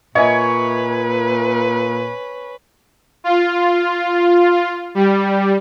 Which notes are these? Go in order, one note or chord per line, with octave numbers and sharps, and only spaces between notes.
A#2 B4 C#5 D#5 E5 G#5
F4
G3